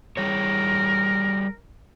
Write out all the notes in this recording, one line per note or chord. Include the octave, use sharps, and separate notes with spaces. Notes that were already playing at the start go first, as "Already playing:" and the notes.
G3 G#4 A#4 C#5